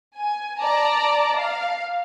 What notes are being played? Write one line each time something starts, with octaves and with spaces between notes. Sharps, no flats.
G#5
D5 A5 A#5
F5